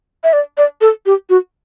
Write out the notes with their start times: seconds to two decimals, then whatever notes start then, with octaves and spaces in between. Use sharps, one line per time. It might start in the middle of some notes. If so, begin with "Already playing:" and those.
0.24 E5
0.33 D5
0.58 D5
0.81 A4
1.06 G4
1.30 F#4